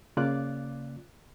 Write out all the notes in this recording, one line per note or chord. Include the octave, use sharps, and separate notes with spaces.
C#3 A#3 F4 D5 D6 F#6